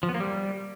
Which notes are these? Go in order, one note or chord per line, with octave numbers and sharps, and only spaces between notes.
F3
B3
A#3
G3